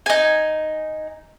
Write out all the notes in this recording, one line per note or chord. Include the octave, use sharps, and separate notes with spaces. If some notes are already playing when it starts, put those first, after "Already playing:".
D#4 G#5